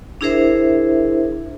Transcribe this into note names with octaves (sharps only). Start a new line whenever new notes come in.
D4 E4 G#4 A#4 C5 E5